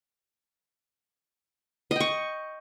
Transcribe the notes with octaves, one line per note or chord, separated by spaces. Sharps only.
D#5 G5 C#6